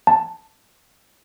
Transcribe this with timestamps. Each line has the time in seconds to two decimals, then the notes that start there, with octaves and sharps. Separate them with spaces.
0.07 A5